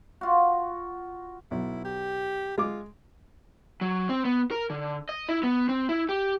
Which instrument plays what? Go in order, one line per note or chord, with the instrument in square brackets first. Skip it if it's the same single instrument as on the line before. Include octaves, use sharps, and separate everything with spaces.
[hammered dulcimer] F4 F#4
[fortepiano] B1 [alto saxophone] E4
[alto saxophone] G4
[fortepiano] G#3 D6 [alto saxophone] F4
[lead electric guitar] F#3
C4
B3
A#4
D3
D#5
E4
B3
C4
E4
G4